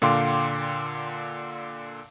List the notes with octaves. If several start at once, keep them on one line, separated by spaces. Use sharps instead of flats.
A#2 D3 F5 G5 C6 D6